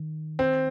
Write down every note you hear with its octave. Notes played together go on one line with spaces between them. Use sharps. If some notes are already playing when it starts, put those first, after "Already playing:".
Already playing: D#3
C4